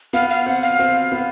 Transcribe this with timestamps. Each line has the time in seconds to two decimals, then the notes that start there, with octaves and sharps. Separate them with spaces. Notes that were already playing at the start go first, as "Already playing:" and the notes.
0.13 B3 F5
0.30 F5
0.46 C4 F#5
0.62 F5
0.79 C4
1.12 B3